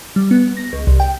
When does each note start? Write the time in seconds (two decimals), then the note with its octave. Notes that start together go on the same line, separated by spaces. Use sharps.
0.16 G3
0.31 B3
0.57 A#6
0.73 C#2
0.87 C2
1.00 G5